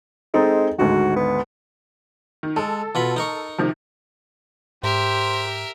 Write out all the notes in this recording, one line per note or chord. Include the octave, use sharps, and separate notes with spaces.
G#3 C4 D#4 A4
G#1 D2 G#2 F#4
B3
D#3
G#3 A4
B2 F4 B5
D#4 A#4 C#6
C3 D#3 F3
G#2 G4 A#4 C5 E5